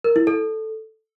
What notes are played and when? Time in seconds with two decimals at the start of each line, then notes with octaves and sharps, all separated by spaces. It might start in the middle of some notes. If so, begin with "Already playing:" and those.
0.04 A#4
0.16 E4
0.27 A4